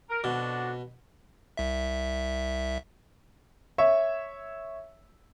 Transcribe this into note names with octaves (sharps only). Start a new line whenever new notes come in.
A#4
F2 B2 D4 F#4
C2 E5
C#5 E5